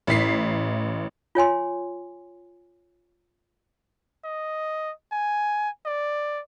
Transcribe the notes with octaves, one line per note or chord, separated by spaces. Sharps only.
A1 E4 B6 C7
F4 C#5 G#5 C6
D#5
G#5
D5